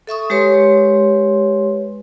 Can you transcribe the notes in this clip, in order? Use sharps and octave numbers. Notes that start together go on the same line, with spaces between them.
A4 E5 C#6 D#6
G#3 G4 B4 C#5 C6